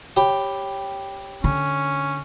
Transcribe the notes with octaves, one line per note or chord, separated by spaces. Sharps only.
G4 C#5 G5 B5
D3 C#4